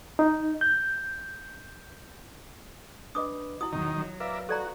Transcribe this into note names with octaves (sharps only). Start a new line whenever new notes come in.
D#4
G6
D4 B4 D#5 D6 D#6
E4 F#4 D#6
E2 B2 D#3 F#3 D#4
F#3
A#4 B4 D5 E5 F5
F#4 A4 D5 A#5